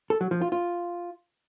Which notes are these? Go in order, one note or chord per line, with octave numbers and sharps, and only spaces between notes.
A4
F#3
F3
F4
F4